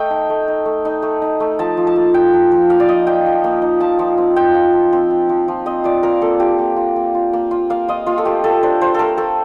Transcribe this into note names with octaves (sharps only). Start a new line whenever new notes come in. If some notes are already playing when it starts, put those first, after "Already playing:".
Already playing: A3 D#5 G5
D#4
A3
D#4
A3
D#4
A3
D#4
A3
F3 A5
F3
A5
A#3
D#4 G5
F3
F3
A#3 F5
D5
D#4 D#5
F3 G5
F3
A#3
D#4
F3 A5
F3
C4
F4 G5
F3
F3
C4
F4
F3
F3
C4 D#5
F4 D5
F4 A#4
A#3 A4
F4 G4
A#3
F4
A#3
F4
A#3
F4
A#3 F5
F4 D#5
A#3 F4
A4
A3 G4
A3 A4
D4 C5
F4 C5
A3 A4 A#4
A3 A4